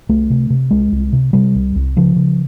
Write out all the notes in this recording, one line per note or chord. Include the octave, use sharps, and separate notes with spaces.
C2 A3
C3
C3
C2 G#3
C2
C3
C3 G3
C2
C2
C#3 F3
C#3